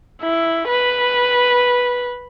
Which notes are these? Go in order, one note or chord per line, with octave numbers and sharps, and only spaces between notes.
E4
B4